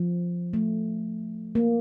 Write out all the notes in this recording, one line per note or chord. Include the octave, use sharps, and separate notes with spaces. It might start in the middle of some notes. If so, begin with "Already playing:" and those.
Already playing: F3
A3
A#3